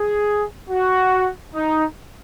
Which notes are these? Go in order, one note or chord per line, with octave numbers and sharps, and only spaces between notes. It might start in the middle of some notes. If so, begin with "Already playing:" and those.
Already playing: G#4
F#4
D#4